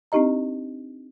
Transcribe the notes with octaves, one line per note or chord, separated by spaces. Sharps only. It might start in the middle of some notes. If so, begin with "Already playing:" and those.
C4 D4 D#4 G4 D#5 A#5